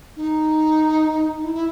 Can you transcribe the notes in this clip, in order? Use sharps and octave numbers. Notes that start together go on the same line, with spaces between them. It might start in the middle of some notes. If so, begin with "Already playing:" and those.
D#4
E4
E4